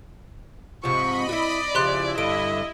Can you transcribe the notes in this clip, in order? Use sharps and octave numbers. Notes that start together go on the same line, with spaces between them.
G#2 C3 F3 D#5 B5 C#6
E4 F#4 D5
C#3 F3 E4 G4 C6 F#6
G2 D3 D#5 D7